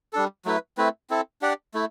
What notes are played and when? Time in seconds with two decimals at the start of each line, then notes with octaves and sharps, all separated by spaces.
0.13 G3 D4 A4
0.45 F#3 A3 E4 B4
0.78 A3 C4 E4 B4
1.10 C4 E4 A4
1.42 D4 G4 D5 F#5
1.74 A3 E4